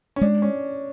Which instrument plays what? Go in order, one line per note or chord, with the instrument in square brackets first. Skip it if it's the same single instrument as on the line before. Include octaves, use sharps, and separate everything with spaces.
[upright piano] C#4
[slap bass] G#3 [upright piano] D4
[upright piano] C#4